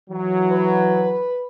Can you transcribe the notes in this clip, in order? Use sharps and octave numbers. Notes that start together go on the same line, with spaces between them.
E3 F#3
B4